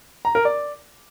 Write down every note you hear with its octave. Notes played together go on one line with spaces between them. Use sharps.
A#5
A#4
D5